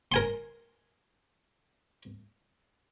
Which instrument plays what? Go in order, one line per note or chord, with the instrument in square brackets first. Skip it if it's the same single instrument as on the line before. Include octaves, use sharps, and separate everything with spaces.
[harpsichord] A#4 G#5 C6